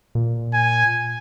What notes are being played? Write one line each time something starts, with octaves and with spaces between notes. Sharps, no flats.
A#2
G#5